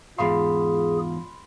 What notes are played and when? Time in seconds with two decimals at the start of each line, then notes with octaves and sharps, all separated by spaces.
0.18 E2 G#2 F4 G#4 F5 B5 C6